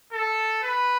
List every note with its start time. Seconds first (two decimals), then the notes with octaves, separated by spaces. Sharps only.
0.12 A4
0.63 B4